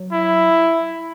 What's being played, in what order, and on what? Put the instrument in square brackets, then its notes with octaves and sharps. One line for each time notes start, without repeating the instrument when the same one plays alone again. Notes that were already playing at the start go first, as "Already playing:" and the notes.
Already playing: [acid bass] F#3
[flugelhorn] E4